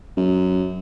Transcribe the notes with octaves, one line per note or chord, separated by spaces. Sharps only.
F#2